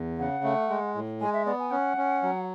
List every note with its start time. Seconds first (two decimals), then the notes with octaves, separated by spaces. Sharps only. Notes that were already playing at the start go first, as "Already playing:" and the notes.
Already playing: E2
0.19 C#3 F#5
0.44 A3
0.70 G#3
0.95 A2
1.21 G#3 G#5
1.33 E5
1.46 B3 D5
1.59 G#5
1.71 C#4 F#5
1.97 C#4
2.23 F#3